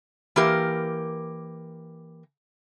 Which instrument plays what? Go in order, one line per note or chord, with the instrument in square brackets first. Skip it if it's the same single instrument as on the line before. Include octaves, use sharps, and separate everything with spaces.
[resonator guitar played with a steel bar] E3 A#3 G4 A#4